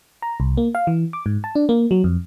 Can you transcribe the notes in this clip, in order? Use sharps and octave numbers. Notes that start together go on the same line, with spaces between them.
A#5
C2
A#3
F5
E3
D6
G#2
A5
D4
A#3
F#3
F2